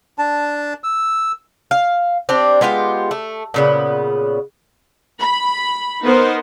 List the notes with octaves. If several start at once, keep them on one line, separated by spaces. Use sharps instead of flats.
D4 A5
E6
F5
C4 D4 G4
G#3 B3 F4 G4
A3
A#2 C#3 B3
B5
B3 D#4 A#4 C5